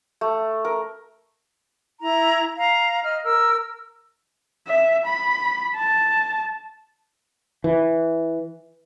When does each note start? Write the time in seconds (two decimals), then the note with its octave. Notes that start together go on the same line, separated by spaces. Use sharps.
0.21 A3
0.65 A#4
2.01 E4 A#5
2.56 F5 A#5
3.04 D#5 F6
3.23 A#4 E6
4.68 E5
5.06 B5
5.76 A5
7.64 E3